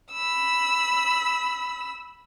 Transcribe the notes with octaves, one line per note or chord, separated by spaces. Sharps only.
B5 E6